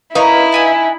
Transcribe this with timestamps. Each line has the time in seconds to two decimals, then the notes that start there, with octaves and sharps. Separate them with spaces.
0.15 C#4 D#4 E4 A#4 B4 D#5 F5
0.52 D4 G#5 D#6